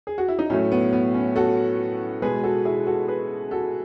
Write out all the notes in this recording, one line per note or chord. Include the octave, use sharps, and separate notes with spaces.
G#4
F#4
E4
D#4
A2 F#3 A3 C#4
B3
B3
C#4
F#4 A4
B2 G#3 G#4 B4
F#4 A4
E4 G#4
F#4 A4
G#4 B4
F#4 A4